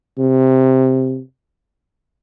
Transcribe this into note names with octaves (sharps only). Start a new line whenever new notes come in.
C3